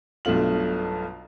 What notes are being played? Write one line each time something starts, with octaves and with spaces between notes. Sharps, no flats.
B1 G2 B2 A3 F4 F#7